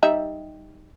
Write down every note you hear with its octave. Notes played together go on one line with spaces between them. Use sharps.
G3 D#4 E5